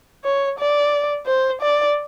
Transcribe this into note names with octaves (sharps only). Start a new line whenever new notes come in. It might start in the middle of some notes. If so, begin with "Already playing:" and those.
C#5
D5
C5
D5